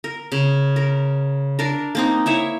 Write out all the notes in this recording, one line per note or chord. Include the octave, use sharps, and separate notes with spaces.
A#4
C#3
A#4
D4 A#4
A#3 C4 D#4
E4 C#5 E5